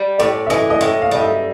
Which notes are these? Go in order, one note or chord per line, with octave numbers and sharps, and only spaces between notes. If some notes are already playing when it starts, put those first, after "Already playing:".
Already playing: G3
A2 D5
E5
E3 D#5
D#5
A2 E5
F5
G3 D#5
E5